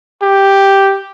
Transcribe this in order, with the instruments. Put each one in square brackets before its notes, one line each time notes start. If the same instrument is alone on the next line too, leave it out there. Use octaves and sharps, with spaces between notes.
[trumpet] G4